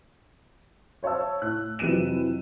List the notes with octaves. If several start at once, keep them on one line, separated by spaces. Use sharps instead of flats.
C5 C#5 F5 A5 E6
A2 F#6
F2 C3 E3 F#3 D#7 E7